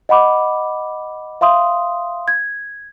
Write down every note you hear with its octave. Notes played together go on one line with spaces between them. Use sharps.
D#5 F#5 B5 D6
E5 F5 C6 D#6
G#6